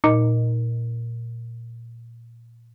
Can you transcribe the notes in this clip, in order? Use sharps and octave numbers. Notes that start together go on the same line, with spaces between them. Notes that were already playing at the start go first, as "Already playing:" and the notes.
A#2 D#4